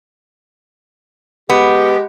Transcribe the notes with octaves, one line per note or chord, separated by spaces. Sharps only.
G#3 B3 G4